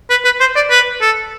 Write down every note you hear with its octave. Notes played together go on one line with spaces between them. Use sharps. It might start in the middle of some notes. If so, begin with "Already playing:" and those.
B4
B4
C5
D5
B4
A4